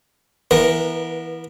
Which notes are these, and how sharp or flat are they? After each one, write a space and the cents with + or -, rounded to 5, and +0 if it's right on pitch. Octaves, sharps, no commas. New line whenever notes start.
E3 -5 B3 -25 A#4 +5